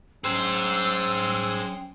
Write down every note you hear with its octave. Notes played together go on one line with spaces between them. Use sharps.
F#3 C#4 G#4 C5 G5 E6